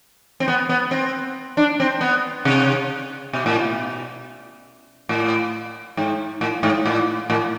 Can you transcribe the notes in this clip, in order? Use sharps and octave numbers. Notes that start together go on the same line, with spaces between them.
C4
B3
B3
C4
D4
C4
B3
C3
B2
A2
B2
A2
G#2
A2
G#2
A2
A2